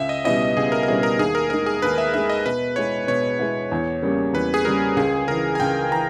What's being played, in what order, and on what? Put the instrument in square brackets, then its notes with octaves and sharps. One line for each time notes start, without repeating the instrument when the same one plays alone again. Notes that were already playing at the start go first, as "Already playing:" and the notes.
Already playing: [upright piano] C#2 [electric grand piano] E5
[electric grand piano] D#5
[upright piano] B2 G3 C#4 E4 [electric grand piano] D#5
[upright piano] C#2 [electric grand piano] G#4
[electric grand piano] A#4
A#4
[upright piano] B2 G3 C#4 E4 [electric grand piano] G#4
[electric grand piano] A#4
[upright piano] D#2 [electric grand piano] G#4
[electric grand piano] A#4
[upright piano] D#3 G#3 [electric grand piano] A#4
[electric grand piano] G#4
[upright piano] D#2 [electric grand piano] B4
[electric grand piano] E5
[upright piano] D#3 G#3 [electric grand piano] E5
[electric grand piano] D#5
[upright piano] B2 [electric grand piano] B4
[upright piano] G#3 B3 E4 [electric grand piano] C#5
[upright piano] B2 [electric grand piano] C#5
[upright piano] G#3 B3 E4
E2
C#3 G3 A#3
[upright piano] E2 [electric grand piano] B4
[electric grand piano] G#4
[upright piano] C#3 G3 A#3 [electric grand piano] A#4
[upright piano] C#2 [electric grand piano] G#4
[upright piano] C#3 E3 [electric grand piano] A#4
[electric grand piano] G#5
[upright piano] C#2 [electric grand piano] G5
[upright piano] E3 [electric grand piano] A#5